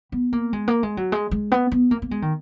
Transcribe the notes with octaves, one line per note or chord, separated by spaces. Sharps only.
B3
A#3
G#3
A#3
G#3
F#3
G#3
G#3
B3
B3
A#3
A#3
G#3
D#3